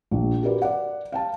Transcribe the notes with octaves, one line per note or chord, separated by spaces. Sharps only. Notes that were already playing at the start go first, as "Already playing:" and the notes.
A#1
F#4 G4 A#4 B4 D5
D5 F#5
F5 G5 A5